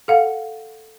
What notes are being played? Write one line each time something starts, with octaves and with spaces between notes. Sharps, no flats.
A4 F5 F#5